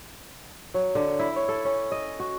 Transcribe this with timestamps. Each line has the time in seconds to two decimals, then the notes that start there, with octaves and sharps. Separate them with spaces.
0.74 F#3
0.95 D3
1.19 E4
1.36 C#5
1.49 A4
1.65 C#4
1.92 D#5
2.20 F#4